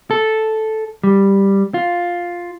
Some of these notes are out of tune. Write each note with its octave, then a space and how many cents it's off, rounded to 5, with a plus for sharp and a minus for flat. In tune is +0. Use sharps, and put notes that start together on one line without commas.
A4 -5
G3 +5
F4 +5